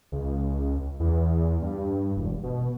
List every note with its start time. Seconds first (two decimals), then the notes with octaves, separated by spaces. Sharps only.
0.12 C#2
1.00 E2
1.62 G2
2.17 E1
2.43 B2